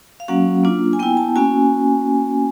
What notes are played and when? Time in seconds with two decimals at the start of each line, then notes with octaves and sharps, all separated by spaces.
0.20 F5
0.28 F#3 A#3 C#4 F#4 F#5
0.64 A#3 D4 F4
0.93 G#5
0.99 B3 G5
1.03 E4
1.17 A5
1.36 A#3 C#4 F#4 G#5